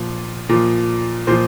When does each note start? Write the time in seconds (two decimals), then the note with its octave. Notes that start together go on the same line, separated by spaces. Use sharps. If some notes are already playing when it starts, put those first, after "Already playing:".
Already playing: A#2 F3
0.49 A#2 F3
1.27 A#2 F3 C5